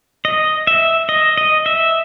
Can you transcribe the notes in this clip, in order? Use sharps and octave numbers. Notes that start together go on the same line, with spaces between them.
D#5
E5
D#5
D#5
E5